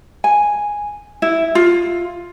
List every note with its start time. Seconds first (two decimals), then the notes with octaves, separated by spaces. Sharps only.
0.24 G#5
1.22 E4
1.55 F4